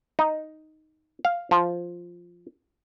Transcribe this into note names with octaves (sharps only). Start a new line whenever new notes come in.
D#4
F5
F3